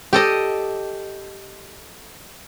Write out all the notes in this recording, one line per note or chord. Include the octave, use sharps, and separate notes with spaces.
G4 A4 D#5